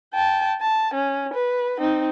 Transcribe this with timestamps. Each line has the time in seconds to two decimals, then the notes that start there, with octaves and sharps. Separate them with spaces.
0.14 G5 A5
0.61 A5
0.94 C#4
1.34 B4
1.79 C4 D#4